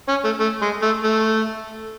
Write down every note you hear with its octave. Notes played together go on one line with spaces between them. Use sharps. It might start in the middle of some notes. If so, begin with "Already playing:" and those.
C#4
A3
A3
G#3
A3
A3